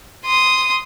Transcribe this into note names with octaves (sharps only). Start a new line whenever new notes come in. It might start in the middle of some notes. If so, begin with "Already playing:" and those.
C6 D#6